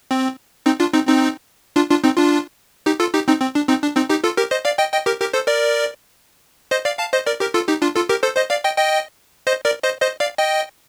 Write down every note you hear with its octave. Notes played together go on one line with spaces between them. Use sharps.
C4
C4 D#4
D4 F4
C4 D#4
C4 D#4
D4 F4
D4 F4
C4 D#4
D4 F4
D#4 G4
F4 A4
D#4 G4
C4 D#4
C4
D4
C4 D#4
D4
C4 D#4
D#4 G4
F4 A4
G4 A#4
C5 D#5
D5 F5
D#5 G5
D#5 G5
G4 A#4
G4 A#4
A4 C5
A#4 D5
C5 D#5
D5 F5
F5 A5
C5 D#5
A#4 D5
G4 A#4
F4 A4
D#4 G4
D4 F4
F4 A4
G4 A#4
A4 C5
C5 D#5
D5 F5
D#5 G5
D#5 G5
C5 D#5
A#4 D5
C5 D#5
C5 D#5
D5 F5
D#5 G5